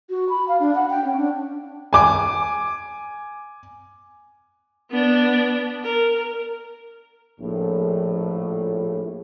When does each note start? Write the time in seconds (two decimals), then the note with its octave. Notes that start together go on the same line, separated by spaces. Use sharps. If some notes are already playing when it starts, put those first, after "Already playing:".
0.10 F#4
0.29 B5
0.48 F5
0.60 D4
0.75 F#5
0.90 G5
1.04 C#4
1.18 D4
1.93 G#5 D6
4.91 B3 D4
5.83 A#4
7.40 A#1 A2